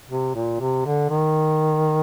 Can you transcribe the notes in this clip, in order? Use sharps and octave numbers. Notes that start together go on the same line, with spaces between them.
C3
A#2
C3
D3
D#3